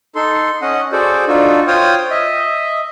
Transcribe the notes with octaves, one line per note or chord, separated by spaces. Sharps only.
D#4 A4 C6
C#4 D#5 F#5
F#4 G#4 A4 C5 D5
D4 D#4 F4 F#4 A4
F4 C5 C#5 G5 D#6 F6
D#5 E5